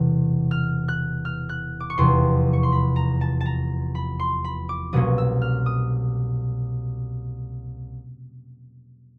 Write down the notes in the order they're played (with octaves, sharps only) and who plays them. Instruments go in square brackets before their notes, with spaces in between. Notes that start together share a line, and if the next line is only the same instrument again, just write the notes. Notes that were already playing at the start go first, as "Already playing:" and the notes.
Already playing: [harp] E1 E2 C3 E3
F6
F#6
F6
F#6
D6
C#6
F1 E2 C3 C6
C#6
C6
B5
A#5
A5
A5
A#5
B5
C6
B5
D6
C2 B2 F#3 A#3 C#4 D#6
E6
F6
D#6